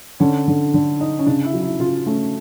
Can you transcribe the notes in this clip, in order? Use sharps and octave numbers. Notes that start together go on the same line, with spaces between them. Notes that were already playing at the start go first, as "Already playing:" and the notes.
D3 C#4
D3
D3
D#4
C#4
C#3 D4
E4
F#3
E4
C#3 F4
A3 C#4